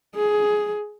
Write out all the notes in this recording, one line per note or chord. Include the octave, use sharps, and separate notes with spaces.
G#4